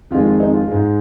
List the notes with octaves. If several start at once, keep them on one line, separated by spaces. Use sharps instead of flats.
F2 D#3 G#3 F4
F4
D#4
F4
G#2 G#3